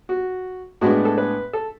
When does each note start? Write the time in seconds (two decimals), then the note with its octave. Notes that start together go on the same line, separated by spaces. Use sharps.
0.09 F#4
0.81 A2 G#3 B3 D4 F#4
1.05 A4
1.18 B4
1.53 A4